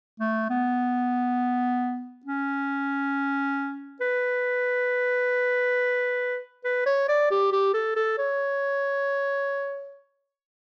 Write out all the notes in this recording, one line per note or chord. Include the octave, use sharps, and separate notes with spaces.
A3
B3
C#4
B4
B4
C#5
D5
G4
G4
A4
A4
C#5